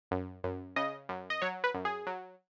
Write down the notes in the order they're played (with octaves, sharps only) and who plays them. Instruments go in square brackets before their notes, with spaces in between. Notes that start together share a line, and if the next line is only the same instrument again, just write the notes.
[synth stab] F#2
F#2
C#3 D#5
F#2
D#5
F#3 C#5
B4
F#2
G#4
F#3